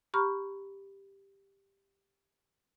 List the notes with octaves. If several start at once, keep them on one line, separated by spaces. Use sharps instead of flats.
G4 A#5 B5 C#6 F6